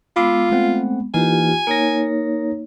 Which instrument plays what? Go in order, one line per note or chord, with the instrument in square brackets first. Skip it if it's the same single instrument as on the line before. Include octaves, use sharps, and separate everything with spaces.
[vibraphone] G#3 B3 [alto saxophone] F4 [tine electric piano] B5 D6 E6
[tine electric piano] A3 C4 F#5
[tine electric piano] E3 A#3 D#4 [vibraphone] F4 G4 [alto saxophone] G#5
[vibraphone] A#3 D#4 C#5 [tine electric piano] A#4 A#6